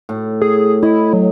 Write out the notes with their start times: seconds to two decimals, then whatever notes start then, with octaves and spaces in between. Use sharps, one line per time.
0.09 A2
0.42 G#4
0.83 E4 D#5
1.13 F#3